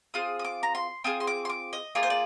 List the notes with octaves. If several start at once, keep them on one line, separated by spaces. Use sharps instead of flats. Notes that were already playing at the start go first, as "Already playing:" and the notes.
C4 F4 G#4 D#6
D#6
D6
A#5
C6
C4 F4 G#4 D#6
C6
D6
C6
D6
D#5
A#3 F4 G#4 D5
C5
D5